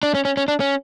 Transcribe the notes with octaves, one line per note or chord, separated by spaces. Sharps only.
D4
C#4
C#4
C#4
D4
C#4